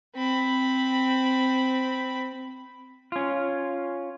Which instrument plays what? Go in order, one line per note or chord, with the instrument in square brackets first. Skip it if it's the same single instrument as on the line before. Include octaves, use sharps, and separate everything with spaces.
[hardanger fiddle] C4 B5
[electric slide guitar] C#4 F4